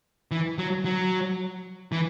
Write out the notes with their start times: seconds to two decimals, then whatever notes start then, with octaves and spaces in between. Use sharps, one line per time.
0.31 E3
0.58 F#3
0.85 F#3
1.92 E3